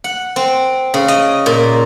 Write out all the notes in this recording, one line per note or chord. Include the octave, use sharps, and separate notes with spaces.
F#5
C4
C#3
D#5
A#2